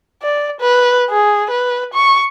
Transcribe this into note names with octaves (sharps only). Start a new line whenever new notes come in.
D5
B4
G#4
B4
C#6